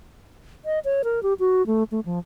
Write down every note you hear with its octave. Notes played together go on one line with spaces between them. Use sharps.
D#5
C#5
A#4
G4
F#4
A3
A3
F3